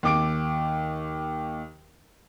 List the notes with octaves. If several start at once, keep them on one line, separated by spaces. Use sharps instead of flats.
D#2 D6 D7